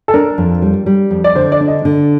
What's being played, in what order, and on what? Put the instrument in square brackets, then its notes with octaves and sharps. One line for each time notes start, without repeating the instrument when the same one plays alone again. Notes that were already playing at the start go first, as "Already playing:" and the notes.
[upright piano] A4
[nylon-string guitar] D4 [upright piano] A#4
[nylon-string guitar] F2
G3
G3
F2
[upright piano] D5
[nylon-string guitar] D3 [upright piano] C5
[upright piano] D5
[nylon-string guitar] D4
[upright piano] D#5
[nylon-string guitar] D3